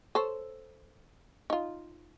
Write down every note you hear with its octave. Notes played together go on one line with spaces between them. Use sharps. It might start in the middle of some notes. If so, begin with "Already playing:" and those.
A4 C5 C#5
D#4 F4